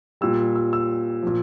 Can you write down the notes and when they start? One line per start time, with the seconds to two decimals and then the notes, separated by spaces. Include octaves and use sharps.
0.21 A#2 G3 E6
0.56 E6
0.73 E6
1.23 A#2 F3